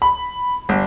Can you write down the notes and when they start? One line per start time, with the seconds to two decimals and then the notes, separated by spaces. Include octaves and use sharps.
0.02 B5
0.69 G1